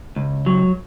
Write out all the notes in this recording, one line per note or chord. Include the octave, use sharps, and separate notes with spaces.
C#2
F#3